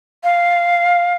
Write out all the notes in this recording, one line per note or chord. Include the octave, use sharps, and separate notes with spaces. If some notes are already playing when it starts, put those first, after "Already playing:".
F5